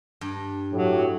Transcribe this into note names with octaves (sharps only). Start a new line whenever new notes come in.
G2
A2 F#3 G4